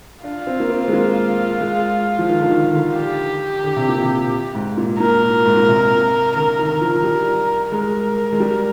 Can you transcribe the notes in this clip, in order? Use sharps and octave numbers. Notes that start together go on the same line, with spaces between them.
D4 F4
C4
A#3
C4
G#3
A#3
G#3
F3
D#3
D3
D#3
D3
G4
D3
C3
A#2
C3
G#2
A#2
A#2 A#4
G#2
A#2
C3
D3 A#4
D#3
A#4
F3
G3
G#3 A#4
G#3
G3